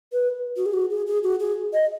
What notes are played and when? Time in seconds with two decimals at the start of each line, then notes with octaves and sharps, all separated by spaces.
0.13 B4
0.57 F#4
0.66 G#4
0.74 F#4
0.90 G#4
1.07 G#4
1.23 F#4
1.40 G#4
1.73 D#5